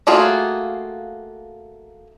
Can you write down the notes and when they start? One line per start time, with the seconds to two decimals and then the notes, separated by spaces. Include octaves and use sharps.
0.07 A3 A#3 F4 F#4 G#4